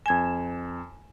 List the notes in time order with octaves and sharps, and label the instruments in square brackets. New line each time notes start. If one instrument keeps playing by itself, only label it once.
[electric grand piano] F2 E7 [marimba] G#5 G#6